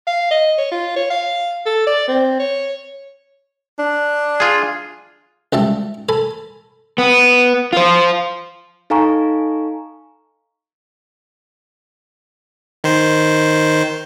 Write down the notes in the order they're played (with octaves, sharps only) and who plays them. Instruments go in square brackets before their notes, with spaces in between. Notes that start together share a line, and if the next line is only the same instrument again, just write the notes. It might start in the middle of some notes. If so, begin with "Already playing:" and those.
[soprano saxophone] F5
D#5
C#5
F4
C#5
F5
A4
D5
C4
C#5
[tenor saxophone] D4
[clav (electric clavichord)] F4 G#4
[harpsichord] C#2 G3 E5 A5
A4 G#5 B5
[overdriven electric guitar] B3
F4 C5
[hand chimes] D#4 A4 F5 G#5 A#5 C#6
[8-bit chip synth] D#3 C5